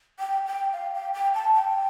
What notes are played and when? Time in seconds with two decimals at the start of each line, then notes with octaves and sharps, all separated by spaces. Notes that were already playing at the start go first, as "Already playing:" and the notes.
0.19 G5
0.47 G5
0.73 F5
0.94 G5
1.14 G5
1.34 A5
1.55 G5